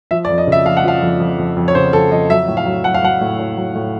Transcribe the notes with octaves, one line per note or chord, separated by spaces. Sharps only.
F3 E5
D5
F2
D#5
C#3 E5
F3 F5
F#5
F3 F5
F2
F2
F2
F2
C#5
C#3 C5
F2 A4
F2 D#5
F#3 E5
A2
F5
F#3
F#3 F#5
F5
F#3 F#5
A2
A2
F#3
A2